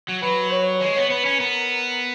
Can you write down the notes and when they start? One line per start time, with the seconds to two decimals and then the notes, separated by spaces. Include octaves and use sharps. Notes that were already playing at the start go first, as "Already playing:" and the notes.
0.08 F#3
0.23 F#3 B4
0.52 C#5
0.81 G#3 C#5
0.96 B3
1.10 B3 B4
1.25 C#4
1.40 B3 A#4